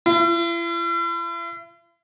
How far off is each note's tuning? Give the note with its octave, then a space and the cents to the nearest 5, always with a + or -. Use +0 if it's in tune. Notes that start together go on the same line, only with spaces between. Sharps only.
E4 +45